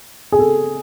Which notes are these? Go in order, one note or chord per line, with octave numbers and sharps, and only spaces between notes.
G#4
A4